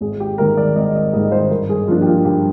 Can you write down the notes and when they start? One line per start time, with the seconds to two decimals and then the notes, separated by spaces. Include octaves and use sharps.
0.01 G#1 G#4
0.20 G4
0.38 G#2 D#3 G3 A#4
0.57 D5
0.76 G#1 D#5
0.95 D#5
1.13 G#2 D#3 G3 D#5
1.32 C5
1.50 G2 A#4
1.69 G#4
1.88 F3 A#3 D4 F4
2.02 G4
2.06 F4
2.25 G2 G4